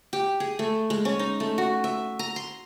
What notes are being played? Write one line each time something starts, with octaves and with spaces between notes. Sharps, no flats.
G4
G#4
A3
G#3
C#4
D#4
A3
F#4
E5
A#5
C6